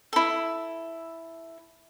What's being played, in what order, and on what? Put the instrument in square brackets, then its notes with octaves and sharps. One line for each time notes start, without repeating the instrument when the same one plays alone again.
[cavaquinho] E4 A4